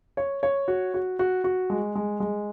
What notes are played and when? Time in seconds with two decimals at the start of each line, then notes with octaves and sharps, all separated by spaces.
0.17 C#5
0.43 C#5
0.68 F#4
0.94 F#4
1.19 F#4
1.44 F#4
1.70 G#3
1.95 G#3
2.20 G#3